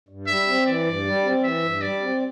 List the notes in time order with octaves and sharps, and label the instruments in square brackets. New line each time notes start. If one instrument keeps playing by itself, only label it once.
[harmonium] G2
[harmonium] G3 [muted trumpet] E5
[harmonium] C4
[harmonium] E3 [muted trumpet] D5
[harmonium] G2
G3
C4
[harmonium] E3 [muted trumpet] E5
[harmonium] G2
[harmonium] G3 [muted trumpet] D5
[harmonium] C4